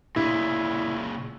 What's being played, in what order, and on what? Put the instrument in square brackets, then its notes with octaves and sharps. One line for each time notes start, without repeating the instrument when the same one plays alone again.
[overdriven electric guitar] A#2 C#3 [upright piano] E4